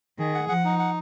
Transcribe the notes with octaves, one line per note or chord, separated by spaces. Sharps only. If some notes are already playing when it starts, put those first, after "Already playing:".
D#3 G#4
F#5
F3 F#5
D#4
F#5